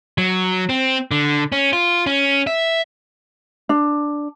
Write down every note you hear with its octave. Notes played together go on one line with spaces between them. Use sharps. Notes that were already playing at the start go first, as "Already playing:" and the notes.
F#3
C4
D3
C#4
F4
C#4
E5
D4